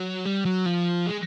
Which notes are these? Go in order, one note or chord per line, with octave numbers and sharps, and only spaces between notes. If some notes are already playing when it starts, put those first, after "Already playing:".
Already playing: F#3
G3
F#3
F3
G#3